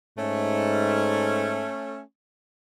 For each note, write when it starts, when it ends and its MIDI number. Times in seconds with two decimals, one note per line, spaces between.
0.18 1.71 44
0.18 2.01 57
0.18 2.01 61